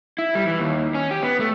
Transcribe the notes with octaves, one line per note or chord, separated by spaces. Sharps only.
E4
G3
E3
D#2
C#4
G4
B3
A3